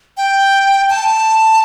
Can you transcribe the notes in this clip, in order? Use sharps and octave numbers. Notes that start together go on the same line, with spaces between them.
G5
A5